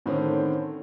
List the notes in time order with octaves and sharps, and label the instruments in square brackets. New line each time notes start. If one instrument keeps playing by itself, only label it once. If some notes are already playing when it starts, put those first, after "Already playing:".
[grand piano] A2 D3 D#3 C4 C#4